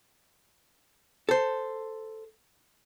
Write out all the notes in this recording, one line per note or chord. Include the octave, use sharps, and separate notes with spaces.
A4 C5